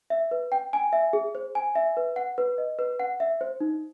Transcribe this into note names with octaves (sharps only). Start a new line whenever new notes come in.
E5
B4
G5
G#5
E5
G#4
C5
G#5
E5
B4
F#5
B4
D#5
B4
F#5
E5
C5
D#4